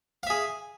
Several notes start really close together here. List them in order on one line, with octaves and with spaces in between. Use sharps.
F5 E5 G#4